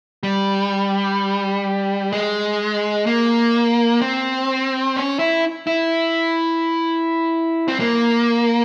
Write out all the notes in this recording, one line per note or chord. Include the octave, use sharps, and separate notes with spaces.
G3
G#3
A#3
C4
C#4
E4
E4
C4
A#3